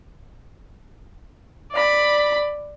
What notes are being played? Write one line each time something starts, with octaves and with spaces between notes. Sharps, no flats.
D5 B5